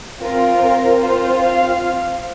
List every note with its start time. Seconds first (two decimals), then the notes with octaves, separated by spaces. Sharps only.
0.21 C4 F4 A#4
0.61 A#4
1.01 C4 F4 C5
1.42 F5